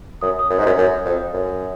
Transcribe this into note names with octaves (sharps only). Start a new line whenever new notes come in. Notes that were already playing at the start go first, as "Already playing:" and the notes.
F#2 D#6
D#6
F#2
G#2
F#2
F#2
F2
F#2